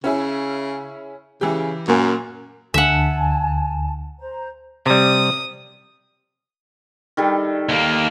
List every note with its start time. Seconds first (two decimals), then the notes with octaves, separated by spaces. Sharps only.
0.04 C#3 C#4 E4 G#4
1.41 C#3 E3 G4
1.88 F#2 A#2 A#3
2.74 D2 D3 E5 F#5 G#5 A5
4.19 C5 A#5
4.86 C3 G3 D#6
7.17 D#3 G3 A4
7.69 D#2 A#3